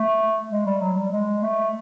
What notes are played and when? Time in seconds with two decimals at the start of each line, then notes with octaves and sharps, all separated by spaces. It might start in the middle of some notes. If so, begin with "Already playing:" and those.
Already playing: A3
0.51 G#3
0.66 G3
0.81 F#3
0.98 G3
1.12 G#3
1.42 A3